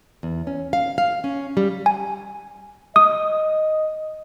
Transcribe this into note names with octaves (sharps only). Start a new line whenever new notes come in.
E2
C#4
F5
F5
C#4
G3
G#5
D#5 D#6